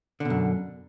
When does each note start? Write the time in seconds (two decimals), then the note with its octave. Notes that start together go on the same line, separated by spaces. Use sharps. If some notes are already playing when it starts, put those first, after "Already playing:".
0.20 D3
0.25 B2
0.30 F#2